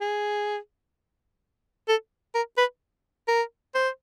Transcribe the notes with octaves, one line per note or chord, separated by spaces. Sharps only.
G#4
A4
A#4
B4
A#4
C5